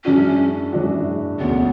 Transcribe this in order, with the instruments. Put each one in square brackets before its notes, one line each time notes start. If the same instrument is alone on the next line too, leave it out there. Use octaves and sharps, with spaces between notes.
[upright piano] F#2 E3 G#3 D4 F#4 [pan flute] C#4
[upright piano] F#2 E3 G#3 D4 F#4
[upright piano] E1 D2 C#3 [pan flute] B3